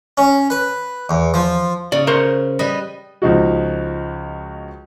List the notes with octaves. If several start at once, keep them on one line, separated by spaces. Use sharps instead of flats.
C#4
B4
E2
F3
C#3 D5
A#4 C5 C#5
G3 B4 D#5
C#2 F3 D#4 F#4